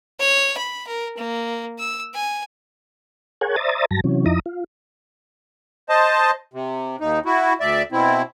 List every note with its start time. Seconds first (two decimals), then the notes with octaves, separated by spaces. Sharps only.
0.19 C#5
0.57 B5
0.87 A#4
1.17 A#3
1.79 E6
2.14 G#5
3.41 G#4 A#4 C#5 F#5 G#5
3.56 C5 D5 E5 A#5 D#6 A6
3.91 G2 F#3 A5 A#6
4.04 C3 E3 F#3 C#4
4.26 F2 F3 D#4 E4 A#5 D#6
4.46 F4
5.89 C5 D#5 A5
6.54 C3
7.00 D#2 D#4
7.25 E4 F#4
7.60 D2 D5 E5
7.92 B2 C4 E4